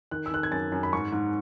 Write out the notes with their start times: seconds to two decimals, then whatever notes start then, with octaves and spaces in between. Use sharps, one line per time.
0.11 D#3 F#6
0.26 E6
0.31 D#3 F#6
0.43 G#6
0.51 F#2 A6
0.72 F#2
0.83 B5
0.93 G#2 C#6
1.12 G#2